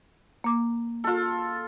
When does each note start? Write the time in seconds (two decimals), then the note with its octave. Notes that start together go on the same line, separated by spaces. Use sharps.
0.44 A#3 D6
1.04 F4 A4